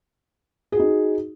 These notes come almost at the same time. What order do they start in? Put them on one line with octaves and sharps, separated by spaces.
G#4 F#4 D#4